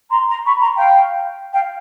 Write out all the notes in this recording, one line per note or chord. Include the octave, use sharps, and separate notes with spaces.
A#5 C6
A#5 C6
B5 C#6
A#5 C6
F5 G5
F5 G5